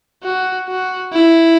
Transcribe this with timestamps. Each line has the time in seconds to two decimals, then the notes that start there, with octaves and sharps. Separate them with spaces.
0.24 F#4
0.68 F#4
1.13 E4